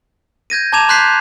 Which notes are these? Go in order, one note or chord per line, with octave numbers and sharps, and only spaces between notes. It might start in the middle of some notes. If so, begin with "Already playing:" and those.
G6 G#6 A#6 D#7
A5 A#5 D6 G#6 E7 F7
C6 F#6 G6 B6 C7